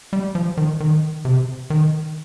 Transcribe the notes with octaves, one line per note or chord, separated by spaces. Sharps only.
G3
F3
D#3
D#3
C3
D#3